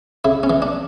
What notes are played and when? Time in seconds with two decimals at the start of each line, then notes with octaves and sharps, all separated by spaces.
0.25 C#3 E4
0.43 C#4
0.50 E3
0.62 D4